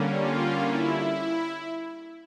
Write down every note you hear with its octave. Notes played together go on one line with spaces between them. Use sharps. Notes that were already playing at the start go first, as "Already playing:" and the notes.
Already playing: D3 G3 A#3 C#4
F4
E4